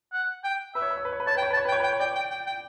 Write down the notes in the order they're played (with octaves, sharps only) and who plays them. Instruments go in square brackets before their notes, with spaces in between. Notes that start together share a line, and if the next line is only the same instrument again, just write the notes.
[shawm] F#5
G5
[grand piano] B4 [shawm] E5
[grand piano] C#5
B4
C#5
B4
C#5
B4
[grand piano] C#5 [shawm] A5
[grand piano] B4 [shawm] G5
[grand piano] C#5
B4
[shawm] A5
[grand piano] C#5
B4
[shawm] G5
[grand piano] C#5
[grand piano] B4 [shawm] G5
[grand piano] C#5
[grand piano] D5 [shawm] G5
[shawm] G5
G5
G5